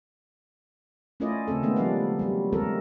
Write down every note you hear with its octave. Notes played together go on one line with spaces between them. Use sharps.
A3 C#4 E4 F4 D5 D#5
C#3 A3 C4 A4
D#3 G#3 A3 B3 D4
F3 G3 D4 D5 F5
F#3 G3
D#3 G#3 A#3 C4 A4 A#4